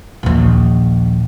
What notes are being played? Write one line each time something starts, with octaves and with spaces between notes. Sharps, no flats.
A#1 D#2